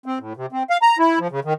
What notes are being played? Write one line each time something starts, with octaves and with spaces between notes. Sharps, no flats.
C4
A2
C3
C4
F5
A#5
E4
F3
C#3
D#3